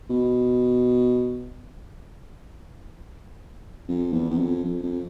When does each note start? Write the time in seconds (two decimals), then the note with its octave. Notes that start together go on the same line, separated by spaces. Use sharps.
0.10 B2
3.88 F2
4.13 E2
4.31 E2
4.39 F2
4.64 F2
4.83 F2